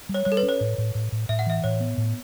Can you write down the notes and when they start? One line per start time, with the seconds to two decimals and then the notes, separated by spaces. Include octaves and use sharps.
0.09 G3
0.14 C#5
0.25 G3 C#5
0.32 A4
0.37 B4
0.43 C#4
0.49 C#5
0.60 A2
0.78 A2
0.95 A2
1.12 A2
1.29 A2 E5
1.39 F#5
1.46 E3 E5
1.64 A2 C#5
1.80 B3
1.98 A2